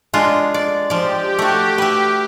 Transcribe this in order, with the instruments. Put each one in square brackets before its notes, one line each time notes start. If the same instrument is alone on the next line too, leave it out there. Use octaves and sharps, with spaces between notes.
[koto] G#3 D4 F4
D5
[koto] F3 D5 [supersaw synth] G4
[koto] A3 F#4
B4 E5